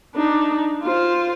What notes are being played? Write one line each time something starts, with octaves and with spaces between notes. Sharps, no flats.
D4 D#4
F4 C5